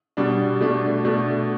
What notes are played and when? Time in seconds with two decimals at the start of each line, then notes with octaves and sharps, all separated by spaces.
0.17 B2 G3 D4
0.60 B2 A3 D4
1.05 B2 A3 D4